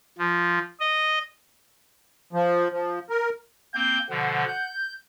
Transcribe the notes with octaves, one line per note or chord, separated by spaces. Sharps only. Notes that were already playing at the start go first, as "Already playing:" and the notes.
F3
D#5
F3
F3
A#4
A#3 C4 G6
B2 D3 F3 F#5
G6